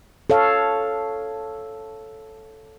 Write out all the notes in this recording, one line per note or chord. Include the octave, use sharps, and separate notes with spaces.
A4 C#5 F5